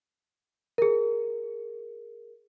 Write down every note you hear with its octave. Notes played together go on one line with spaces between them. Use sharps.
G#4 A#4